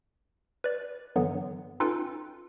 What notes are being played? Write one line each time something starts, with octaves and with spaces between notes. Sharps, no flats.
B4 D5
G2 D3 E3 F#3 B3
C#4 D#4 F4 A4 B4 G5